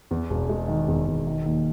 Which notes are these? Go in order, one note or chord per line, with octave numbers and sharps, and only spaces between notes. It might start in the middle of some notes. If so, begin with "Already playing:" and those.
E2
E1
G#3
D#3
E2
E1
D#3
D#2